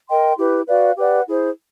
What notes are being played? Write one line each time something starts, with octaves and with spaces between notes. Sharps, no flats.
A#4 D#5 G5 C6
E4 G4 B4
F#4 B4 D5 F5
G4 B4 D5 F#5
E4 G#4 C5